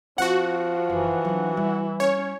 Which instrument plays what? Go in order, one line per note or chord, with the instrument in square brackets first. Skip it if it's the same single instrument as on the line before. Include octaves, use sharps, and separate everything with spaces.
[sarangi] F3 [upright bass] C4 [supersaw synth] F#4 F#5
[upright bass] F#1 [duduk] E3
[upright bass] F#3 D4
[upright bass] G3 [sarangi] E4
[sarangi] C#4 [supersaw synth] C#5